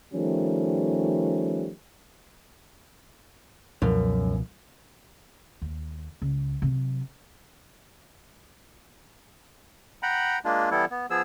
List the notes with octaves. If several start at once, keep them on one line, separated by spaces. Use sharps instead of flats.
D#3 F3 G3 A3 C#4
C#2 F#2 B2 F3
D#2
C#2
C3 F#3
F#5 G5 A#5 B5
G#3 A#3 D4 F4
E3 G3 B3 E4 A4
B3
F3 B3 G#4 E6